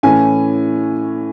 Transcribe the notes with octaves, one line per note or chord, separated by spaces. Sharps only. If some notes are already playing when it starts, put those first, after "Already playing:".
A2 E3 A3 C#4 G#5